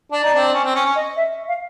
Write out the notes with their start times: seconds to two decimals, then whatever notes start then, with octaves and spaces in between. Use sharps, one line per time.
0.12 D4 D5
0.24 D#4
0.34 C4 D4
0.54 C#4
0.64 C4
0.75 C#4
0.85 C#4
0.95 D#5
1.16 E5
1.48 F5